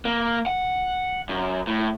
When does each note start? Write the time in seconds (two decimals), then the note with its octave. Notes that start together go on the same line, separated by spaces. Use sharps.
0.05 A#3
0.46 F#5
1.29 F#2
1.67 A2